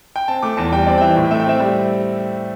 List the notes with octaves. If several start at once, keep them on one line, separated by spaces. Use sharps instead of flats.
G5
C4 A5
A3 D6
E2 A5
G3 G5
C4 D5
G5
E3 E5
A2 G5
A3 E5
G5
C4 E5
G3